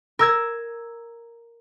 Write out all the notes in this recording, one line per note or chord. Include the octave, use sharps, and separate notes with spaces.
A#4 E6 G#6